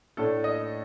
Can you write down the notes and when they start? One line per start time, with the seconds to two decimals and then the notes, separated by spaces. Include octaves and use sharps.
0.17 A2 A3 D4 A4
0.44 D#5